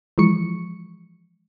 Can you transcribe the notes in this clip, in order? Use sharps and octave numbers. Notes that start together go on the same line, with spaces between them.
E3 F3 G#3 C#6 C#7